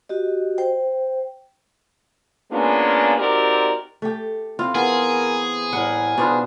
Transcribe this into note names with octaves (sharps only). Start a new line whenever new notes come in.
F#4 G4 D#5
C5 G5
G#3 A#3 B3 C#4 D4 F4
C4 D#4 F#4 G4 A#4 D5
A3 G4
C4 E4 F4
E3 B3 C4 G#4 A#4 B4
A2 G3 A#4 F#5
B2 B3 D4 D#4 F4 B4 C5